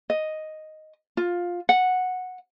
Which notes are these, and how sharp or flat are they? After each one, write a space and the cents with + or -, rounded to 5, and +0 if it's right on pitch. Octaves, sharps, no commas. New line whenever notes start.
D#5 +0
F4 +10
F#5 -10